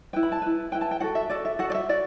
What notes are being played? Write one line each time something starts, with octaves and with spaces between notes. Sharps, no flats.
E4 B4 G5
B5
A5
E4 B4
E4 B4 G5
A5
G5
F#4 A4 F#5
E5
F#4 A4 D5
E5
F#4 A4 F#5
D5
E5
F#4 D5